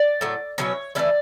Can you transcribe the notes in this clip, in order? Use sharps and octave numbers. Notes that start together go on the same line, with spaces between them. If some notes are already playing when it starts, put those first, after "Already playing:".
Already playing: D5
A2 F#3 A3
B2 F#3 C#4 E4 C#5
E3 A3 C#4 E4 D5